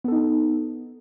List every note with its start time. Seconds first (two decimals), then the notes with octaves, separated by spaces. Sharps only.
0.04 B3
0.08 A4
0.12 D#4